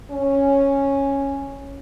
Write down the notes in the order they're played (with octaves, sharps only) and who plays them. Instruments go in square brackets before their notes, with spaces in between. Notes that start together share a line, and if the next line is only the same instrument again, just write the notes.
[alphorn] C#4